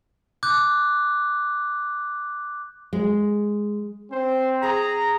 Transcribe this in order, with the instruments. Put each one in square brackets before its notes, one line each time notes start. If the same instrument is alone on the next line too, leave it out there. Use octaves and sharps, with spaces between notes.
[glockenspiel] D6 F#6 G6
[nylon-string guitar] G#3
[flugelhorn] C4 [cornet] C5
[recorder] G#4 [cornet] A#5